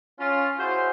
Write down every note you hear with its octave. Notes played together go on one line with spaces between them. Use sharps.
C#4 F4
E4 F#4 G#4 C5